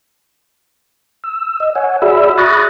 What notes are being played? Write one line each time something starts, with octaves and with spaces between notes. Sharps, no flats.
E6
D#5
C#5 F#5 G#5
F#4 G#4 D5 E5 B5 E6
B5 C#6 D#6 F#6 A6 A#6